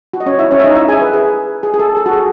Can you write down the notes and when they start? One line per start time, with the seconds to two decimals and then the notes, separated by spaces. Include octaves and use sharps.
0.13 F#4
0.20 D#5
0.26 C#4 C#5
0.39 E4 E5
0.51 C#4 C#5
0.59 E5
0.64 D#4 D#5
0.75 E4 E5
0.88 G#4 G#5
1.01 B4
1.13 G#4
1.63 G#4
1.74 G#4
1.79 A4
1.97 A4
2.06 F#4
2.13 G#4